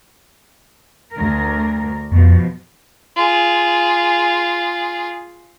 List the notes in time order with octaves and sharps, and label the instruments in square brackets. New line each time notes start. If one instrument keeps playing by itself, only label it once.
[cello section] D2 A#4
[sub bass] F2 [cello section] B2 F3
[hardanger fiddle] F4 G#4